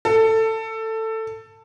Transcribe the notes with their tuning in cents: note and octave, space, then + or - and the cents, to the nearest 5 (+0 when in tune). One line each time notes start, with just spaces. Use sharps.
A4 +15